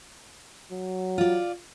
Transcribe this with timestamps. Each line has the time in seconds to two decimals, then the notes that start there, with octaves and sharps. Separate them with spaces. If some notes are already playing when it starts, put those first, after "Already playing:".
0.71 F#3
1.18 F4 D5